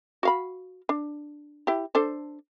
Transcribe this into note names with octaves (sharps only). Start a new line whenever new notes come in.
F#4 F5 B5
D4
E4 G4
D4 A4 C5